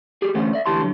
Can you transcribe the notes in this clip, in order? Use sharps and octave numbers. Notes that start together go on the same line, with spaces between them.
G3 G4 G#4
D2 E3 A3 C#4 C5 F#5
D5 E5
D2 E3 G4 A5 C6
D3 F#3